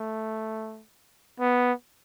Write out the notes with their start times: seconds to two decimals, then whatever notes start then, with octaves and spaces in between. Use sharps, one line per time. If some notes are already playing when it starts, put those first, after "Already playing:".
Already playing: A3
1.40 B3